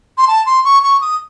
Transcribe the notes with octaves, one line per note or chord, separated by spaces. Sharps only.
C6
A5
C6
C#6
C#6
D#6